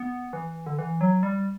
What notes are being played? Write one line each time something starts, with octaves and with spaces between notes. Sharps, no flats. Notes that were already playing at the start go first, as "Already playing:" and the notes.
Already playing: B3
E3
D3
E3
F#3
G3